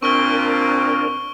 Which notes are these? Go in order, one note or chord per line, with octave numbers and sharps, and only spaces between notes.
A#2 C4 D4 A#4 C#6 D7 G7